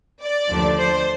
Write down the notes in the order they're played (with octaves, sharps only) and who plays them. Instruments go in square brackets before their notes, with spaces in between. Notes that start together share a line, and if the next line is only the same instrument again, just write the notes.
[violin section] D5
[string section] D#2 D3 F3 A3 D4
[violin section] C5